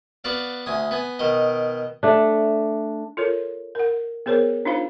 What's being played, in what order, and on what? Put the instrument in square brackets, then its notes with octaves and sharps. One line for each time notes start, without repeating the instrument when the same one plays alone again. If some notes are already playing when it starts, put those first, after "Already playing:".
[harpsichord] B3 F#4 D5 F5
D2 G#5 D#6
B3 G#5
B2 D#3 D#5
[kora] A3 D4
[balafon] F4 A4 A#4 C#5
A#4 F#5
B3 G#4 A#4 C5 C#5
D4 D#4 F4 C5 F5 B5